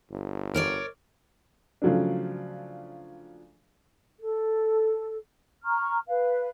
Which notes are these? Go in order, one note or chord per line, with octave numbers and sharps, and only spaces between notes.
G1
A#4 C#5 D5
C#3 F3 F#3 A3 D4
A4
A#5 C#6 F6
B4 F5